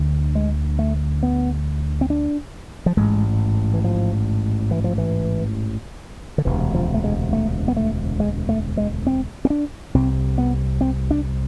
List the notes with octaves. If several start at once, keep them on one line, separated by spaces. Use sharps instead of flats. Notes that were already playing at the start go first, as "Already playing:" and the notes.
Already playing: D2 D3
G#3
A3
B3
C4
D4
F3
A1 G#2 G#3
E3
F3
E3
F3
E3
D3
E1 D2 C3 E3
F3
A3
G#3
A3
B3
A3
G#3
A3
G#3
C4
C4
D4
C2 C3 C4
B3
C4
D4